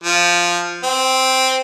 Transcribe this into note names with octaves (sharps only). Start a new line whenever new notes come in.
F3
C4